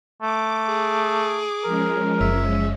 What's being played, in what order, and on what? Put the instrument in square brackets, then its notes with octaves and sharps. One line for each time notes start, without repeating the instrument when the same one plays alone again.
[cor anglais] A3 [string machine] D6
[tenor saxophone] G#4
[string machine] F3 G#3 C#4 [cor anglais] A#4
[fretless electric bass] F#1 [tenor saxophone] E5